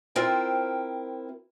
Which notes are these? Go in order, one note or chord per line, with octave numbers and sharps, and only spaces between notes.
C4 E4 F4 A#4 C5 G5